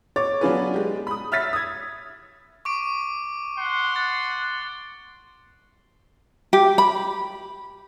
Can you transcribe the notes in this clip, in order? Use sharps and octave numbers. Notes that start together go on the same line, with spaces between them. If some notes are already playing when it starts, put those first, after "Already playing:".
C#5 D6 A6
F#3 B3 D4 F4 G#4 B4
G#3 G4
B5 D#6
E5 E6 F6 A6 B6
D#6 G#6
C#6 D6 D7
F#5 C6
A6
G4
B5